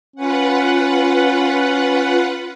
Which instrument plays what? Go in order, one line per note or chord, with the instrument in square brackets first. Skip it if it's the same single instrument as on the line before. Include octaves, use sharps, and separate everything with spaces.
[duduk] C#4 [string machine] F4 B4 F#5